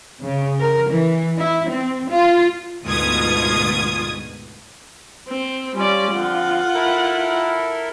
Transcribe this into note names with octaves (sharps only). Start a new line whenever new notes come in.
C#3
A#4
E3
E4
C4
F4
D2 G#2 B2 F4 D#6 G#6
C4
G3 C#4 F4 D5
D3 F3 C4 F4 F#5
E4 A4 A#4